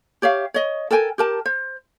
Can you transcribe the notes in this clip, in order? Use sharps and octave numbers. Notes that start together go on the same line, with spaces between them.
G4 C#5 E5 F5
C#5 D#5
A4 A#4 G5 G#5
G4 A#4 A5
C5